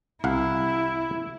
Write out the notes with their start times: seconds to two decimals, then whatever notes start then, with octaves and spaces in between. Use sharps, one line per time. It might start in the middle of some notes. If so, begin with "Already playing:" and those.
0.24 C2 E4 F5 F#5